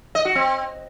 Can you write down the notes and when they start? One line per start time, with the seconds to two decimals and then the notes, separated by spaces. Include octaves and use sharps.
0.15 D#5
0.25 F#4
0.35 C4